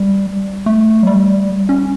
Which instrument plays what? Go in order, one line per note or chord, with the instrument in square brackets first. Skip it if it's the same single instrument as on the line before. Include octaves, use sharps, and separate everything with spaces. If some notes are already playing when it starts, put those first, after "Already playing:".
Already playing: [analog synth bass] G3
A3
F#3
G3
C#4